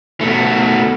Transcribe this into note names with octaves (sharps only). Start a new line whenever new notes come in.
B2 A3